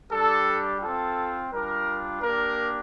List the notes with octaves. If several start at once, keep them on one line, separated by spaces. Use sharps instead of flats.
G3 D4 G4 A4
C4 F4 A4
G3 D4 F4 A#4
A#3 D4 G4 A#4